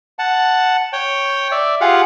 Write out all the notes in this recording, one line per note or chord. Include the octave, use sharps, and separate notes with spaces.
F#5 A5
C#5 G5
D5 E5
F4 G4 G#4 F5 F#5